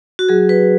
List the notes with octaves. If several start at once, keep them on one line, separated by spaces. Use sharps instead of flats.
F#4
F#3 G#4
B4